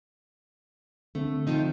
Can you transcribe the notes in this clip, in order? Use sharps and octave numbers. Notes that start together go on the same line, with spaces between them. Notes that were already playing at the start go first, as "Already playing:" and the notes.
D3 A3 C4
D#3 F3 D#4